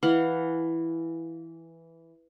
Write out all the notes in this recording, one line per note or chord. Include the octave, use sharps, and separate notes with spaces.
E3 F5 F#5